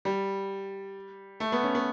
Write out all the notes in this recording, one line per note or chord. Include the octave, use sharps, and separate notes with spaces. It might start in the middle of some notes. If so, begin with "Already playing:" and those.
G3
A3
B3
C#4
B3